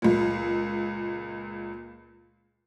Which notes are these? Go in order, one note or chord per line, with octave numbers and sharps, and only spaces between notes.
C#2 A#2